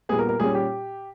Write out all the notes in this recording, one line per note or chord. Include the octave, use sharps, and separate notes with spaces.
A#2 G3 B3 G#4
A#4
A#4
A#2 G3 C#4 G#4
G4